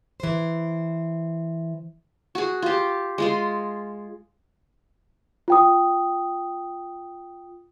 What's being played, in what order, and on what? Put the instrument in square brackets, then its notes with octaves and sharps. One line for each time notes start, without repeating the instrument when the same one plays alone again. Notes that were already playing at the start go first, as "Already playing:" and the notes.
[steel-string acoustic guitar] E3 C5
[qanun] F#4 G#4
F4 G4
G#3 F4 G#4
[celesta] F4 G5 D#6